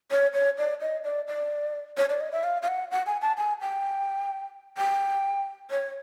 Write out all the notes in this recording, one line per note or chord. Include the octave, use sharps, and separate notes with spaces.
C#5
C#5
D5
D#5
D5
D5
C#5
D5
D#5
E5
F5
F5
F#5
F#5
G#5
A5
G#5
G5
G5
C#5